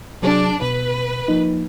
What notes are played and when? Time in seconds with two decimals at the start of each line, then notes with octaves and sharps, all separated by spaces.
0.22 C3 F#3 D4 G#4
0.62 B2 B4
1.28 F3 A#3 D#4